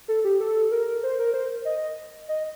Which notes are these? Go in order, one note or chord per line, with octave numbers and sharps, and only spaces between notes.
A4
G4
A4
A#4
C5
A#4
C5
D#5
D#5